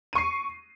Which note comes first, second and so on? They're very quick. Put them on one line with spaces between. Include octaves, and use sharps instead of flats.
D#7 C#6 C7